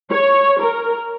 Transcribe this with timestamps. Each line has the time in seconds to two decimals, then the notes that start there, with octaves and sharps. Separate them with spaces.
0.12 C#5
0.61 A#4